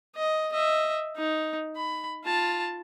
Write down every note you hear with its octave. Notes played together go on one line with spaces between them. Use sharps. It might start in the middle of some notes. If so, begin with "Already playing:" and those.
D#5
D#5 E5
D#4
B5
F4 A5